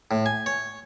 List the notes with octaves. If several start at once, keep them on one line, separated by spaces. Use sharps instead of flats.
A2
G#5
C#5